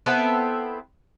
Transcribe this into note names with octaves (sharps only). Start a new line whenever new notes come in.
B3 C4 E4 A4